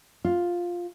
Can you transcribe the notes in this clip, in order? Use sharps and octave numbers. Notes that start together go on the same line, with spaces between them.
F4